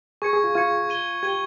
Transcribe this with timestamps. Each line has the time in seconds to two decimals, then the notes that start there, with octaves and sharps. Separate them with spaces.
0.22 G#4 C#6 G#6 C#7
0.33 G#4
0.44 F4
0.55 F4 C#6 G#6 C#7
0.89 G#6 D#7 G7
1.23 G4 G#6 D#7 G7